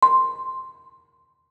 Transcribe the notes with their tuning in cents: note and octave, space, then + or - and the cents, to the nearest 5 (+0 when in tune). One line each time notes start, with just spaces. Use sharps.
C6 +5